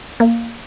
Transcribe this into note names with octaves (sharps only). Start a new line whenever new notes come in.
A#3